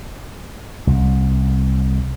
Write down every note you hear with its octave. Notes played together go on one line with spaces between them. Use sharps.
C2